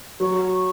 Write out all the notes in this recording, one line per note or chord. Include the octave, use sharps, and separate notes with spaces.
F#3 C#6